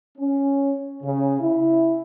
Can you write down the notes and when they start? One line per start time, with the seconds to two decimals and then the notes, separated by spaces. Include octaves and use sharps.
0.18 C#4
1.03 C#3
1.40 E4